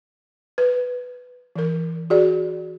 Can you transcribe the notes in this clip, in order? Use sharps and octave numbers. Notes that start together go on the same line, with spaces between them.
B4
E3 A#4
F#4 G#4 D5